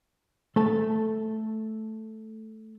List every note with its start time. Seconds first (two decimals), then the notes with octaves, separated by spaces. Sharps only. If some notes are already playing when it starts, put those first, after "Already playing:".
0.56 A3 A4 A5